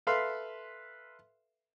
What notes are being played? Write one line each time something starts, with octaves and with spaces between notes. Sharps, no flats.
A4 B4 E5 F5 C6